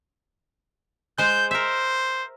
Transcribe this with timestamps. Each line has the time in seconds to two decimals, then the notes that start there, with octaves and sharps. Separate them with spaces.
1.18 G#3 C5 G6
1.51 A#4 C5 E5